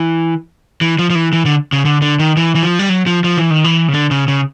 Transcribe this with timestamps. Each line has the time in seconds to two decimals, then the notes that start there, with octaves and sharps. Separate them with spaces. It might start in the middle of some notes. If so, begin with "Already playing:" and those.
Already playing: E3
0.81 E3
0.99 F3
1.10 F3
1.15 E3
1.33 E3
1.45 D3
1.72 C#3
1.85 D3
2.02 D3
2.19 D#3
2.37 E3
2.55 E3
2.63 F3
2.79 G3
2.89 F#3
3.06 F3
3.24 F3
3.38 E3
3.51 D#3
3.64 E3
3.88 C#3
3.94 D3
4.11 C#3
4.28 C#3